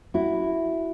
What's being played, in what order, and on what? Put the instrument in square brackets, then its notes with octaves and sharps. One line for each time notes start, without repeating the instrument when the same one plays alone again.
[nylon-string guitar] E4 F#4